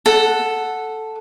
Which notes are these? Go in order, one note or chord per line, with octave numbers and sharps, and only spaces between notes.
A4 F#5